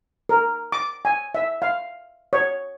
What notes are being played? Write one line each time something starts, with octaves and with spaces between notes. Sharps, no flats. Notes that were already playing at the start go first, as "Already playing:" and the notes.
A#4
D6
G#5
E5
F5
C#5